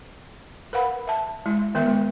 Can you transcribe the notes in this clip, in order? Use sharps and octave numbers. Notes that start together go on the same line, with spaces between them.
A#4 B4 F5 F#5 B5
E5 A5
G#3 E4
D#3 B3 A#4 E5
G#3